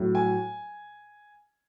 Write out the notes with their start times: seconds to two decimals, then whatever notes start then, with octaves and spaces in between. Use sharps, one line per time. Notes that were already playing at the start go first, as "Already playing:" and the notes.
Already playing: A2 F#3
0.15 G#5